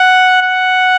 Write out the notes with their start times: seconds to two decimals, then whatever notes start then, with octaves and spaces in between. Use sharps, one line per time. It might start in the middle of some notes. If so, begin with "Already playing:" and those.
Already playing: F#5
0.42 F#5